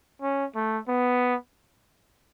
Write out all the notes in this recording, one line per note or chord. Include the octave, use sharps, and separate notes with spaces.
C#4
A3
B3